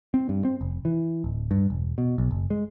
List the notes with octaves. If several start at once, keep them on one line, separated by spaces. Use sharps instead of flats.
C4
G2
C4
F1
E3
D1
G2
E1
B2
B1
F#1
G#3